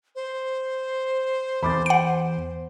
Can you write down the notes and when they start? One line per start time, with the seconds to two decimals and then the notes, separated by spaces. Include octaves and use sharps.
0.15 C5
1.63 E2 B5 D6 A6
1.86 F#5 D7